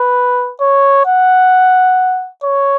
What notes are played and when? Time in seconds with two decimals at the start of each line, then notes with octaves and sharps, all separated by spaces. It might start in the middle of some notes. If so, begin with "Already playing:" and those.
Already playing: B4
0.61 C#5
1.06 F#5
2.43 C#5